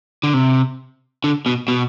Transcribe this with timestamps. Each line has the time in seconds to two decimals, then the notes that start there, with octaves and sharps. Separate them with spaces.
0.23 D3
0.34 C3
1.24 D3
1.46 B2
1.68 B2